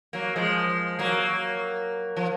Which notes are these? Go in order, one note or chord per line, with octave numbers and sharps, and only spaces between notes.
F#3 A#3
F3 G#3
F#3 A#3
F3